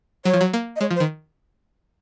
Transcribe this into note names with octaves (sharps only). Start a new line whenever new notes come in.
F#3 C#5
F3
F#3
A#3
D#5
G#3 C#5
F3
C5
D#3